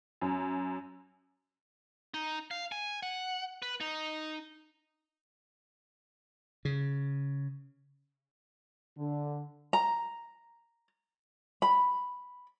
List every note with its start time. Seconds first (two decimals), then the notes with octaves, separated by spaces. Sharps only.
0.21 F#2
2.14 D#4
2.51 F5
2.72 G#5
3.03 F#5
3.62 B4
3.81 D#4
6.65 C#3
8.98 D3
9.73 A#5
11.62 B5